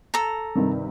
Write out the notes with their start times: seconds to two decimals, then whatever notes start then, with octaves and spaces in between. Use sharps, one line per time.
0.14 A4 A#5
0.55 G2 C3 D#3